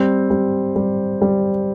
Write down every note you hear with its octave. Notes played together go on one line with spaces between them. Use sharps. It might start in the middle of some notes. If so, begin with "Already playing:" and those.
Already playing: G3 C4
G3
G3
G3